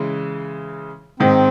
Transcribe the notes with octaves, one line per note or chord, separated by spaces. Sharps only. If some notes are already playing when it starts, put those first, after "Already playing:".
Already playing: C#3 E3 G#3
G#2 D#3 G#3 C4